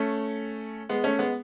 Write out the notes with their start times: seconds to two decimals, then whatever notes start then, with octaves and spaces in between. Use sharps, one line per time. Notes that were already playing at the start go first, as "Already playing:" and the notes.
Already playing: A3 C#4
0.89 G#3 B3
1.04 A3 C#4
1.19 G#3 B3